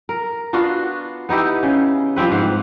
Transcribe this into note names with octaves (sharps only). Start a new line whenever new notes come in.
A#4
B3 D4 F4 F#4
B3 D#4 E4 G4
C#3
F3 G3 C4 B4
G#2 F5 F#5